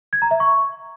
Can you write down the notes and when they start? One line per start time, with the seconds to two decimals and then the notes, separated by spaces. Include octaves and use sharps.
0.13 G#6
0.22 A#5
0.31 E5
0.40 C#6